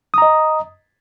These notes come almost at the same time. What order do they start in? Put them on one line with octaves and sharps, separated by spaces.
D#6 A#5 D#5